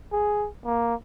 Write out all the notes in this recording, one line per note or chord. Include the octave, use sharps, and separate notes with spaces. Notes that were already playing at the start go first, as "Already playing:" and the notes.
G#4
A#3